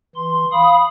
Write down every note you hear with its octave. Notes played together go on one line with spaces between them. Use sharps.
E3 C6
F5 B5 D#6